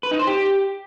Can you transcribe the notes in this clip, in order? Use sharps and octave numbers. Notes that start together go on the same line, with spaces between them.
B4
D#4
C5
G4